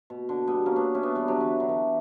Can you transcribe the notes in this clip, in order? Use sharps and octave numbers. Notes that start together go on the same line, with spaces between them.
B2
D3
G3 B3
A#3 C#4
B3 D4
C#4 E4
B3 D4
G3 B3
D3 F#3
E3
D3 F#3
E3